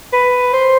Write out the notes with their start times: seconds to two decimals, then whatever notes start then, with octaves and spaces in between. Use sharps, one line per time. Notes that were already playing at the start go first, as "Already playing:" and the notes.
0.13 B4
0.53 C5